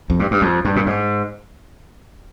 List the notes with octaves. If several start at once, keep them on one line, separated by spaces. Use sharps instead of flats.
F2
G2
G2
F2
G2
A#2
G#2